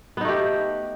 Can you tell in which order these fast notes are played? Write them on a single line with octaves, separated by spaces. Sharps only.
B3 D#4 A3 G4